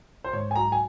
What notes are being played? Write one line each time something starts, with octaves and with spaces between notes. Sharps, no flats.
C5
G#2 C#5
G#5
F#3 A#5
G#5